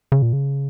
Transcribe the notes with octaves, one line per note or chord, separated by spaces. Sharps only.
C#3
A#2
C#3